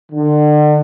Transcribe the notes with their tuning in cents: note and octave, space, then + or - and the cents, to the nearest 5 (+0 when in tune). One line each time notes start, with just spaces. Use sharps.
D3 +35